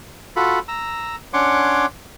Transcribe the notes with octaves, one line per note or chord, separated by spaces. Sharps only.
F4 F#4 A4 B5
A#5 E6
C#4 D4 C#5 F#5 C6 D6